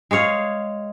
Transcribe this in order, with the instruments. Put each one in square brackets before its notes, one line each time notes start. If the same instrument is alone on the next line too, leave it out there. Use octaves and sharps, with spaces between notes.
[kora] G#3 G#4 C#5 F5